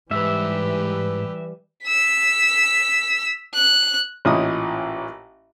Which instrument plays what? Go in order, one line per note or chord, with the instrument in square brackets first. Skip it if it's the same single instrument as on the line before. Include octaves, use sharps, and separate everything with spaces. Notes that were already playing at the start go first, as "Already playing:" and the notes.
[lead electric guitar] G#2 [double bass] E3 G3 [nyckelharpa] G4 B4 [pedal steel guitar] E5
[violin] E6 B6
F#6
[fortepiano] A1 A#2 C#4 E4 D#5 D#6